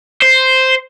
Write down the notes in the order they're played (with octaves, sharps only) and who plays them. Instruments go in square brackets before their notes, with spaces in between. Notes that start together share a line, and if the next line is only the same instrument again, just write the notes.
[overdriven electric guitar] C5